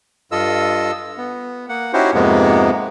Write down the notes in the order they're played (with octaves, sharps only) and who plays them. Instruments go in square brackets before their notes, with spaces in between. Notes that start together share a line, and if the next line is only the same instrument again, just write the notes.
[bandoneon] G2 F4 A4 D#5 E6
B3
A#3 F#5
C#4 D#4 E4 F#4 G4 C5
F2 G#2 C3 G#3 A#3 B3